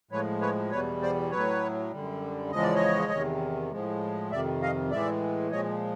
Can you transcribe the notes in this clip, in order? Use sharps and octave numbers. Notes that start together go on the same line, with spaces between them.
A2 F3 G#3 B4 C#5
B4 C#5
E2 B2 G3 B4 C#5
C5 D5
A2 F#3 B4 C#5
F#2 D3 G3
E2 C#3 F3 G#3 D#5
D5
C#5 D#5
E2 C3 D#3
A2 F3 G#3
F2 C3 D#3 D5 E5
D#5 F5
A2 E3 G#3 D5 E5
A#2 F3 G#3 C#5 D#5